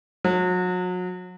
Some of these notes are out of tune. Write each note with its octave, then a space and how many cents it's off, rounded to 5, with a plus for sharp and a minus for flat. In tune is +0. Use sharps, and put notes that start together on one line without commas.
F#3 -35